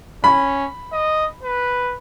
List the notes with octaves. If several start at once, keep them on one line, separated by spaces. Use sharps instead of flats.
C#4 B5
D#5
B4